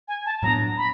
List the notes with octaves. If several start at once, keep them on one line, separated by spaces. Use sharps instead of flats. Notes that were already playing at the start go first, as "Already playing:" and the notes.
G#5
A5
A2 F#3 B3 D4 A#5
B5